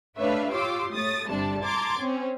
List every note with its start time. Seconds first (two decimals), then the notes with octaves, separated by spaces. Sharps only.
0.18 A3 D4 B4 C#5 E5 F5
0.51 F4 G4 C#5 C6 D6 E6
0.93 A3 C#5 D#6 A6
1.30 G1 C3 G3 D4 D5 A5
1.62 A5 A#5 C6 D6 G#6 A6
1.99 C4 C#4